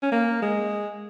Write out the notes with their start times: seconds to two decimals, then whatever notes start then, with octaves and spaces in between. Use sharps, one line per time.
0.02 C#4
0.12 A#3
0.42 G#3